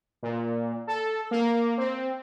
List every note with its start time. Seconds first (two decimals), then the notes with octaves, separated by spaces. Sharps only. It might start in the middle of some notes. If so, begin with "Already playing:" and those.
0.23 A#2
0.87 A4
1.31 A#3
1.78 C4